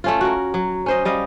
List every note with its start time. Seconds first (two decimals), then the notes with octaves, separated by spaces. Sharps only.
0.04 A3 C#4 F4
0.21 F#4 A#4
0.54 F#3
0.86 C#4 C5 D#5
1.05 G3 D#5 F5